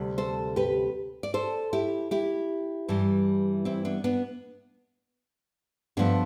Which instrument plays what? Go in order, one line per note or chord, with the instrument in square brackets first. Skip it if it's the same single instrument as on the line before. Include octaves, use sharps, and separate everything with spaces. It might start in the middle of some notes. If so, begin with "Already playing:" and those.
Already playing: [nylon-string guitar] D2 C3 G3
A4 C5
G4 B4
D5
A4 C5
E4 G4
E4 G4
G2 E3 G3
C4 E4
B3 D4
B3 D4
G2 F3 A3 B3 D4